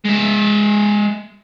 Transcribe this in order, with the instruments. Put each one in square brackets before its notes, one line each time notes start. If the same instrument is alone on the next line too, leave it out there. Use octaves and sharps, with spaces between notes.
[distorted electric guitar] G#3 E5